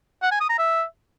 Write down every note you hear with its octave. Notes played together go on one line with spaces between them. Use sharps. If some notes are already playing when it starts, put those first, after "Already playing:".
F#5
G#5
D#6
A#5
E5